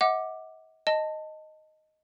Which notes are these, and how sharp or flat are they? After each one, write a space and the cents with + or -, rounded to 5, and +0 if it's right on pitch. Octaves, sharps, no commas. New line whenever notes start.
D#5 +45 F#5 +0 D6 +10
D#5 +0 A5 +15